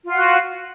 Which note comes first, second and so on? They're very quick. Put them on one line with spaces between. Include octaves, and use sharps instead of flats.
F4 F#5 F#4